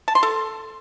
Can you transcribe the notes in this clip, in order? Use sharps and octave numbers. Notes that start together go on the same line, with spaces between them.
A5
C6
A4